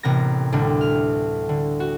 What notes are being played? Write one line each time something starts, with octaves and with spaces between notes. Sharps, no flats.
A1 C3 B3 A#4 A#6
D2 A2 G3 D4
F6
D3
F#4